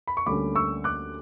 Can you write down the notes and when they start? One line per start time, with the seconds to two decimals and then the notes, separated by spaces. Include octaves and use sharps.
0.07 B5
0.17 C#6
0.26 D2 D3 G3 A#3 C#4 B5 D6
0.56 C#6 E6
0.84 D6 F#6